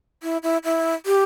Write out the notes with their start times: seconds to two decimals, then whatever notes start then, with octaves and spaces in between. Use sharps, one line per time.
0.23 E4
0.43 E4
0.64 E4
1.06 G4